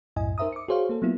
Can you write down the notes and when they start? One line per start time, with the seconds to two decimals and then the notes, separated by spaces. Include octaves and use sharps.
0.16 C2 F#2 A2 E4 D#5 G#5
0.38 D#4 A#4 C5 E5 A#5 D#6
0.52 D6 C#7
0.68 F#4 G#4 C5 C#5 F5
0.89 A#3 A4
1.02 F#3 A#3 B3 E4 F4